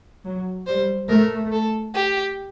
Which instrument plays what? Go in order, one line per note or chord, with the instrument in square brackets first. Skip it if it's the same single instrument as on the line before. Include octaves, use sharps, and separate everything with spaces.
[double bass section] F#3
[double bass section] G3 [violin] C5
[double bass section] A3 [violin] A#4
[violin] A4
G4